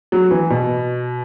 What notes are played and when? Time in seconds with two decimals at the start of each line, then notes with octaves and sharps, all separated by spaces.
0.12 F#3
0.31 E3
0.50 B2